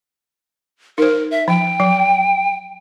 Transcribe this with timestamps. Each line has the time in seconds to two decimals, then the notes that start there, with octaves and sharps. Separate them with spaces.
0.98 D#4 A#4 C5
1.31 E5
1.48 F3 G5
1.80 F#3